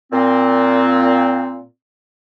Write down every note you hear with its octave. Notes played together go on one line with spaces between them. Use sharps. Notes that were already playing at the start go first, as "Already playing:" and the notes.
A#2 C4